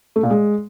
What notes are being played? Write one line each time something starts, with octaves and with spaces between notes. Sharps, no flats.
A3
A#2
G#3